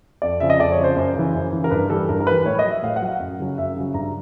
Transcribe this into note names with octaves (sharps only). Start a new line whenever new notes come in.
F2 D5
C#3 F3 E5
D#5
F2 D5
C#5
C#3 F3
C5
F#2
C#3 E3
F#2
C#3 E3
A#4
G2 B4
E3 G3 A4
G2 A#4
A#4
E3 G3 B4
A2 C#5
D#5
F#3
E5
A2 F5
F#5
F#3
F5
F#2
C#3 F#3
F#2 E5
C#3 F#3
G2 A#5